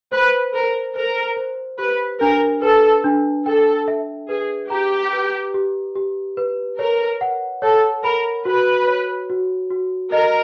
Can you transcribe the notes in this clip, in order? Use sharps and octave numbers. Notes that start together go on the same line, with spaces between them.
B4 C5
A#4 C5
A#4 C5
C5
G4 B4
D4 A#4
A4 B4
D4
A4 G5
E5
G#4 B4
G4 A#5
B4
G4
G4
B4
A#4 C#5
F#5
A4 C#5
A#4 B5
F#4 B4
C#5
F#4
F#4
A#4 D#5